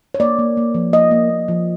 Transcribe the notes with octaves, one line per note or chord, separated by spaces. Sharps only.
C#5
A#3 D5
A#3
A#3
F3
A#3 D#5
A#3
A#3
F3